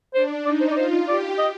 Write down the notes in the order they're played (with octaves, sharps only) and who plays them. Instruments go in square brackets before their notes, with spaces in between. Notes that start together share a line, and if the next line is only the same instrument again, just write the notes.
[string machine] D4 [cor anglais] C5
[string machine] D#4 [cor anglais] D5
[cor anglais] C5
D5
[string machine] F4 [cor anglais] C5
[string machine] G4 [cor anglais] D5
[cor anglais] D#5